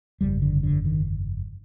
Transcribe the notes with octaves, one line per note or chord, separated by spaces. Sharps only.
G1 F2 C#3 G3
D3
D3
D#3